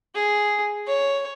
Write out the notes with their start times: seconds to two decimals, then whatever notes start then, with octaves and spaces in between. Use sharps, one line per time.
0.15 G#4
0.87 C#5